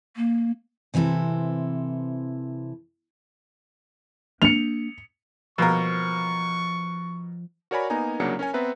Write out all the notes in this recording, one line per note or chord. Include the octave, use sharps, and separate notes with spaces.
A#3
C3 E3 C4 E4 A4
A#3 D4 C#7 F7
B2 F3 A#3 A#4 C#6
F#4 A#4 C#5 D5 G#5 B5
A#3 B3 D#4 G#5 A#5
C2 C#3 F#3 A#3 D4 C#7
C#4 A#4 C#5 G#5
B3 C4 B4 E5 A#5